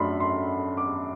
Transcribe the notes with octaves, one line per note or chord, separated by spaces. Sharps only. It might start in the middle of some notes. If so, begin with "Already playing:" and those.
Already playing: F#2 F#3 A3 D4 B5 C6
C6
D6